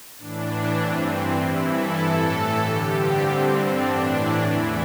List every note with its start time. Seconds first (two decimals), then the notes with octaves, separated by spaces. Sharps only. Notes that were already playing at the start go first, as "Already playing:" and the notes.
0.18 A2 E3 D4
0.79 G2 E3 C4
1.10 C4
1.40 G2 E3 E4
1.71 A4
2.02 A2 E3
2.62 G2 D3 G4
2.93 C4
3.24 G2 D3 C4
3.54 D4
3.85 A2 E3
4.46 E2 E3 E4